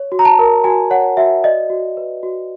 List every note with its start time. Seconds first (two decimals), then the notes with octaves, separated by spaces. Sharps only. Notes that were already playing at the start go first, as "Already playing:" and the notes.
Already playing: C#5
0.12 F#4
0.19 A#5
0.25 A5
0.39 A#4
0.64 F#4 G#5
0.90 C#5 F#5
1.17 F#4 E5
1.44 D5 D#5
1.70 F#4
1.97 B4
2.23 F#4